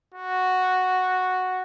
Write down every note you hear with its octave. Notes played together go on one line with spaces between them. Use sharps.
F#4